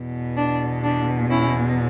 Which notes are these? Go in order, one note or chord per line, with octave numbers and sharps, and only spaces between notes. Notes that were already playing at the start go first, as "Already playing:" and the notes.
Already playing: E2 B2
D4
D4
C#4 E4